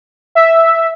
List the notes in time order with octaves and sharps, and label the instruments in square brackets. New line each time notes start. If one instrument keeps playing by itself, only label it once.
[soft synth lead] E5